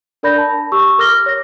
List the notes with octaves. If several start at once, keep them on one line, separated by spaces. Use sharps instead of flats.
D4 A#4 D5 B5 G6 A#6
A5 B5
G4 C#6 E6
A#4 D6 F6 A#6 G7
C#5 A#6